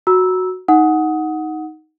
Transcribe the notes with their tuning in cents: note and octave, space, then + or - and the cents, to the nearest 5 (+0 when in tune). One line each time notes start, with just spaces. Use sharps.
F#4 -5 A#5 +20 E6 -10
D#4 +10 F#5 -5 D#6 +20